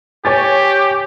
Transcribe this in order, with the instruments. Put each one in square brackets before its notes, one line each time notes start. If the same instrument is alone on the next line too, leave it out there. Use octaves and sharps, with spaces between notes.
[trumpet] G4 [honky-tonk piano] C#5 G#5 A6